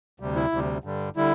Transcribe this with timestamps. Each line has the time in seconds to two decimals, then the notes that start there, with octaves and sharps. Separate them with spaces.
0.20 D2 C3 G3
0.36 E4
0.52 D2 C3 G3
0.84 G2 D3 G3
1.16 D3 G3 E4